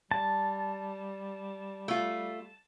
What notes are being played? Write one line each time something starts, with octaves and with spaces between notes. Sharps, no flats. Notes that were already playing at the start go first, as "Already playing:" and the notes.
G3 A5
A3 F4